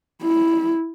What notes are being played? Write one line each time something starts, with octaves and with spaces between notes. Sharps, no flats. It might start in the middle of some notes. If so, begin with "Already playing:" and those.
E4